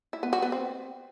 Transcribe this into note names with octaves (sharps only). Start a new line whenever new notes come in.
E4
B3
F#4
B3
C4